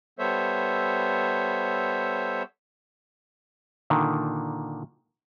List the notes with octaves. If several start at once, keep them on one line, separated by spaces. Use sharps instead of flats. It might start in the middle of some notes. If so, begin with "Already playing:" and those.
G3 B3 A4 C5 C#5 E5
A#2 D3 D#3